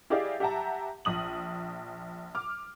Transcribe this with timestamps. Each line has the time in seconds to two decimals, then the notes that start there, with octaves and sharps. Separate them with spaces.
0.10 E4 G4 G#4 D5 D#5 F5
0.40 G4 E5 F#5 A5 A#5
1.05 A#1 D#6 F#7
2.35 D6 F6